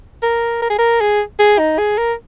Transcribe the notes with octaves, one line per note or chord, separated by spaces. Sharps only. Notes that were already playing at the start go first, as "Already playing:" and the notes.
A#4
A#4
G#4
A#4
G#4
G#4
D#4
G#4
A#4